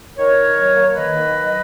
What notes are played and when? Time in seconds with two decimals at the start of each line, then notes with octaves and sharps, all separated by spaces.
0.17 D#3 A#4 C#5
0.36 D#3
0.56 F#3
0.75 A#3
0.95 D#3 B4 D#5
1.15 D#3
1.34 F#3